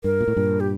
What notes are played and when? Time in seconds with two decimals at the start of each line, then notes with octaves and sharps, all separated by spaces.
0.04 G2 A#4
0.21 A#2
0.28 A2
0.36 G2 A#2
0.60 G4